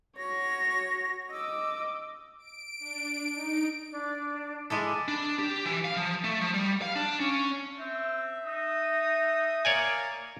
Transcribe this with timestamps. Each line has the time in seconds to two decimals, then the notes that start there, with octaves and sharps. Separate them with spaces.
0.17 F#4 C#5 A#6
1.31 D#5 D6 E6
2.38 D7
2.79 D4
3.34 D#4
3.91 D4
4.70 G#3 E4 A4 B5 D6
5.08 D4
5.39 G4
5.65 E3
5.85 F5
5.97 F3
6.24 A3
6.41 F3
6.54 G3
6.82 F5
6.96 D4
7.20 C#4
7.79 C4 E5
8.45 D#4 D#6
9.65 A#3 C#5 D5 G#5